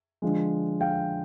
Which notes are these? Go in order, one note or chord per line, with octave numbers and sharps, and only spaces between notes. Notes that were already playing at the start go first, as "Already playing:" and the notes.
D3 F3 G#3
F5 G5